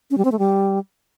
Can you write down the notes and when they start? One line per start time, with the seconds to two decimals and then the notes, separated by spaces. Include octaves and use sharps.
0.11 C#4
0.18 G3
0.25 C4
0.32 A3
0.39 G3